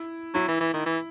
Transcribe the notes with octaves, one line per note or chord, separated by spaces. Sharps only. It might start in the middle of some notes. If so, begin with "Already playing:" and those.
Already playing: E4
F#3 E4
E3
E3
D#3
E3